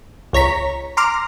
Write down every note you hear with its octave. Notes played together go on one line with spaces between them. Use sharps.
C#2 C#5 A#5 B6
A#5 C6 D6 F6